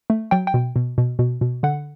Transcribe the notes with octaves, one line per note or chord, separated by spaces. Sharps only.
A3
F#3 G5
G5
B2
B2
B2
B2
B2
D3 F#5